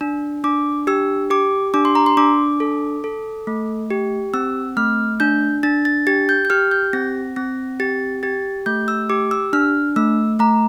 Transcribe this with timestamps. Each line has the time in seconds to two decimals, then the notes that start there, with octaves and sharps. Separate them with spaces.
0.01 D4
0.44 D4 D6
0.87 G4 E6
1.30 G4 D6
1.74 D4 D6
1.85 C6
1.95 A#5
2.06 C6
2.17 D4 D6
2.60 A4
3.04 A4
3.47 A3
3.90 G4
4.34 C4 E6
4.77 A3 F6
5.20 D4 G6
5.63 D4 A6
5.85 A6
6.07 G4 A6
6.29 G6
6.45 G6
6.50 G4 F6
6.71 G6
6.93 C4 A#6
7.36 C4 A#6
7.80 G4 A6
8.23 G4 A6
8.66 A3 G6
8.88 E6
9.10 G4 D6
9.31 E6
9.53 D4 F6
9.96 A3 E6
10.39 A3 A#5